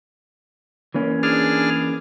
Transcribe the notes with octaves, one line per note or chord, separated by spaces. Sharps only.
E3 A#3 C#4
D4 G#4 F6